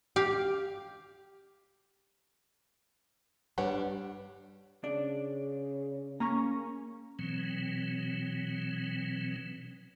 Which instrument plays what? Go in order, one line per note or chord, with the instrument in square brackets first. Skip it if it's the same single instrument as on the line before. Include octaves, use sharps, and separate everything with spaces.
[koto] G4 F5
[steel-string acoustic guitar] G2 G3 D4 [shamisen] B4 C#5 F#5
[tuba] C#3 [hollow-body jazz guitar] D4 D5
[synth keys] A#3 C#4 C#6 [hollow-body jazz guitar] A#5
[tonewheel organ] B2 E3 F#3 C4